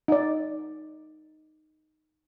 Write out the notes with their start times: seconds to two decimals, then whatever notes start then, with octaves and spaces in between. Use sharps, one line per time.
0.08 D#4 D5